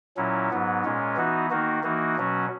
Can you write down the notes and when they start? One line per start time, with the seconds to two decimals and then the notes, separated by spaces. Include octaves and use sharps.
0.17 A#2 F#3 C#4 E4
0.51 G#2 F#3 B3
0.84 A#2 G#3 C#4
1.16 E3 B3 D#4 F#4
1.50 D#3 A#3 D#4 F#4
1.83 E3 A#3 D#4 F#4
2.16 B2 F#3 C#4 F#4